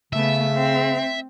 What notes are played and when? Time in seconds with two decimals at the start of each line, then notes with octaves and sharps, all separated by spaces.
0.13 C#3 A3 B3 E5
0.53 C4